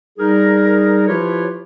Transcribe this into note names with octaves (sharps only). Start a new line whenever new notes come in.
G3 D#4 G#4 A#4
F3 E4 F4 G4 B4 C#5